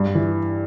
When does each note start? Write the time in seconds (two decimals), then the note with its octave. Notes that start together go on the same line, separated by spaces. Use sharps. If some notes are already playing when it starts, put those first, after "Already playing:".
Already playing: G2
0.15 E3